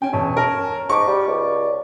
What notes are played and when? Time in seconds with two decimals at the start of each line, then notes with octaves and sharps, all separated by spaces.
0.02 C#4 G5 G#5
0.13 E1 C#4 A5
0.37 A#4 A5
0.89 G#2 C#6 D6
1.07 G3 D5
1.28 C#2